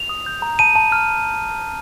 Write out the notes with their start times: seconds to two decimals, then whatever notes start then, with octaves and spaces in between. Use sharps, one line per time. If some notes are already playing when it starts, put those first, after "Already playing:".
Already playing: F7
0.09 D#6
0.26 G6
0.42 A#5
0.59 A5 D#7
0.75 A5
0.92 F6